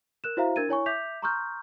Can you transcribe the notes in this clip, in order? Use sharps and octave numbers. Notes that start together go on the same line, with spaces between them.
A#4 F#6 E7
E4 F#4 C5 E5 F5 A#5
D4 A#4 G#6 A6 D#7
E4 C#5 G#5 C#6
E5 D6 G6 B6 F7
A#5 C6 C#6 D#6 F6 G6